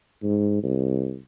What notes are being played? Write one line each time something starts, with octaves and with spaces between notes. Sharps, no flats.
G#2
C2